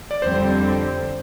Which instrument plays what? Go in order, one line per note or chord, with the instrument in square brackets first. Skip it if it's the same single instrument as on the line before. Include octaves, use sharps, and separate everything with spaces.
[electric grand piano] D5
[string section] F2 D3 G3 C4 [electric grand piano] C5